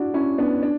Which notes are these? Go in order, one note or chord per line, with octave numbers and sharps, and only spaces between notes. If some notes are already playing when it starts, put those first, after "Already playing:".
Already playing: D4 E4 F#4
C#4 E4
B3 D4
D4